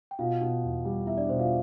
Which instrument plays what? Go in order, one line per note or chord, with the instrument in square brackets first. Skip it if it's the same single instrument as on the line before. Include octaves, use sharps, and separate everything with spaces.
[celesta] G5
[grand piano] B2 [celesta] F4 F5
[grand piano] B2
E2
G3
[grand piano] B3 [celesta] E4 E5
[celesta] D4 D5
[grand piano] B2 [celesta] C5
[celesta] F4 F5